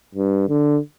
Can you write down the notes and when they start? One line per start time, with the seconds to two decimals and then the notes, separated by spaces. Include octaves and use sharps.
0.15 G2
0.48 D3